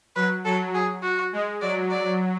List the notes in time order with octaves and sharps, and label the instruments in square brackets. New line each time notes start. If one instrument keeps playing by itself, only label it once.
[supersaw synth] F#3 [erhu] B4
[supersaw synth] F#3 [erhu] A4
[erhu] G#4
F#4
[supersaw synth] G#3
[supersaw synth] F#3 [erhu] D5
[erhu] D5